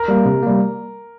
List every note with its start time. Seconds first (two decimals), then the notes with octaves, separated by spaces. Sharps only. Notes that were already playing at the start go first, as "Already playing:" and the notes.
Already playing: A#4
0.08 G3 A#3
0.25 C3
0.43 G3 A#3